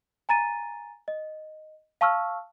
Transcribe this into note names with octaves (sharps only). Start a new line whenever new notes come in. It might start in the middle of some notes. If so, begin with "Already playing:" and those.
G#5 A#5 A6 D#7
D#5
F5 A5 C#6 E6 F6